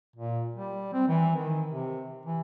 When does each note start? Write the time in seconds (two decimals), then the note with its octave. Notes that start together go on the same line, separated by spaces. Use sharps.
0.16 A#2
0.56 G3
0.93 C4
1.08 E3
1.35 D#3
1.66 C3
2.26 E3